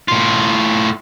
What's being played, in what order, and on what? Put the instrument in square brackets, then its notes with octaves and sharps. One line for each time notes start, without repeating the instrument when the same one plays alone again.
[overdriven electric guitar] A2 F4